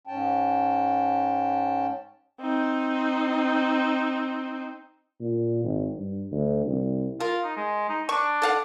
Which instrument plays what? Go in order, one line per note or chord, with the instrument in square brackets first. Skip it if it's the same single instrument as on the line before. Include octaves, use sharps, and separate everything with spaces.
[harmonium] G#2 C#4 G5 A5
[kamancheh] C4 D#4
[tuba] A#2
G#1
G2
D2
C2
[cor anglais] F4 [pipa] A#4
[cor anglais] D#4
G#3
D#4
[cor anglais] D4 [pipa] C#6
[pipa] A4 F5 F#5